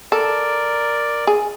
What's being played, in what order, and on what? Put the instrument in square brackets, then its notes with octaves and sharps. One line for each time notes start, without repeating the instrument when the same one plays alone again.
[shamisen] A4 [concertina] A#4 D5
[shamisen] G#4